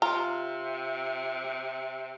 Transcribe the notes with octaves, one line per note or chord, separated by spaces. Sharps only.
C3 F4 A#5